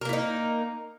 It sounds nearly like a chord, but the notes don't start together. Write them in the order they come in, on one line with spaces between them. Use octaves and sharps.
A#4 A#3 E4 D#4